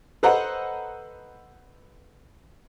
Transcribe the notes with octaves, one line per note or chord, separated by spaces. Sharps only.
A4 B4 C5 D#5 F#5 A#5